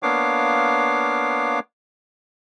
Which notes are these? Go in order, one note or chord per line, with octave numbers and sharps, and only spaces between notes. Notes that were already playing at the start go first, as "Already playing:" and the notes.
A#3 B3 D4 C#5 F5 D6